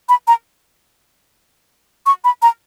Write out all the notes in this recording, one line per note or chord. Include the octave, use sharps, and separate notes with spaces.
B5
A#5
C#6
B5
A#5